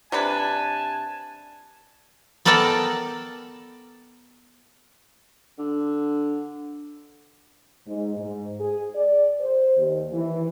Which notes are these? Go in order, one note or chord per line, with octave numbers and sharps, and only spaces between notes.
C3 D4 B4 G#5 A5
B3 A4 A#4 D5 G5 A5
D3
G#2
G#2
G#4
D5
C5
D#2
E3